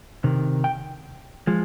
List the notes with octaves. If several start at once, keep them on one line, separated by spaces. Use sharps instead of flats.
C3 D#3
G5
F3 G#3